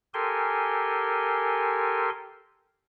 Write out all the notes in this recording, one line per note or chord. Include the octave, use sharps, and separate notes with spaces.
G4 A4 A#4 G#5 C6